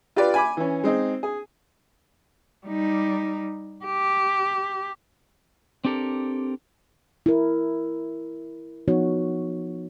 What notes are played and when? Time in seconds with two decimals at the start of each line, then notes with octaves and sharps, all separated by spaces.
0.16 F4 G4 B4 D5
0.34 G#5 B5 D6
0.57 E3 C#4
0.84 G#3 C4 D#4
1.23 G#4
2.66 G3 D#4
3.85 G4
5.85 C4 D4 G4 A4 A#4
7.26 E4 A#4
8.88 F3 B3 D#4 F#4 C#5